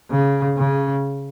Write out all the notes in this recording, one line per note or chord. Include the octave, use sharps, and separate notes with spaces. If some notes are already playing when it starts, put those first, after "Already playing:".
C#3
C#3